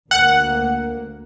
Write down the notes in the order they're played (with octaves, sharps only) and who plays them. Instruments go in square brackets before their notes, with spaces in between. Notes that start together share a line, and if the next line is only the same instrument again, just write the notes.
[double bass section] D2 A#3 [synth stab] F#5